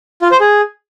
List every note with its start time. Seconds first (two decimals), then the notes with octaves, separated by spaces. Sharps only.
0.22 F4
0.31 C5
0.40 G#4